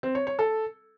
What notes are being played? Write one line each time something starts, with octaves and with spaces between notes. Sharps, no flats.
C4
C#5
C#5
A4